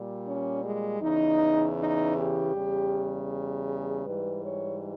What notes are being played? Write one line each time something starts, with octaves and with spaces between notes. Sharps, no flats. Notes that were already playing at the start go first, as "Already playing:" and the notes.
Already playing: A#2 G3
C#4
G#3
E2 C#3 E3 D#4
D#4
G4
E2 C#3 G3
G#4
G#2 E3 G3 B4
C#5